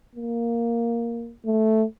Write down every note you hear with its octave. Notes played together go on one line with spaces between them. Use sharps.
A#3
A3